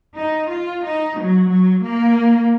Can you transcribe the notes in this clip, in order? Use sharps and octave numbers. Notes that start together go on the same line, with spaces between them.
D#4
F4
D#4
F#3
F#3
A#3